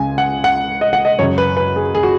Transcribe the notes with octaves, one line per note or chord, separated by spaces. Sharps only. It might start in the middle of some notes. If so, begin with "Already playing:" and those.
Already playing: C#2 C#3 G#5
F#5
F#5
D#5
F#5
D#5
F#2 C#3 C#5
B4
B4
G#4
G#4
F#4